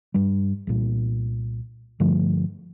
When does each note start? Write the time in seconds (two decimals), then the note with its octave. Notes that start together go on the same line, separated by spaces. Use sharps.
0.14 G2 G3
0.67 C2 A#2
2.00 G2 D3 F3 A3